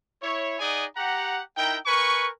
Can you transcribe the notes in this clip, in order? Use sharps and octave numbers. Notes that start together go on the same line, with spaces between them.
E4 C#5
D#4 G#4 D5 D#5 F#5 G#5
G4 F#5 A#5
D#4 E4 A#4 G5
A#4 B4 G#5 C#6